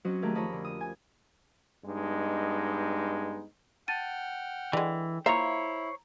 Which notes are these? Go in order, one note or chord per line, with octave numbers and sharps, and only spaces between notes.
F#3 C4 C#4 F#4 D#5
D#3 A3 A#3 G4 G#4 A#4
F2 A#4 C#5 D#5 A5 B5
D3
D#6
G#5
G2 G#3 B3 D#4
F#5 G5 A5 F6 A6 D#7
D3 E3 G#3 G5
A#3 E4 F4 C5 C#5 E5 A#5